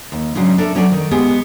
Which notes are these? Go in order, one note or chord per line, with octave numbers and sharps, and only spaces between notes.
D#2
G#2 C#3 F#3 D4
D4 A4 A#4 E5
F#3 C#4 D4 A4 D5
D#3
G#3 B3 G4 G#4